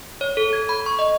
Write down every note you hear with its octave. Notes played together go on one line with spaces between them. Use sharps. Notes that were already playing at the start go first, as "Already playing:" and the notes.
C#5
A4
G#6
B5
C#6
D#5